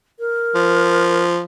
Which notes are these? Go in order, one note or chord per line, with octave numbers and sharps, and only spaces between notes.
A#4
F3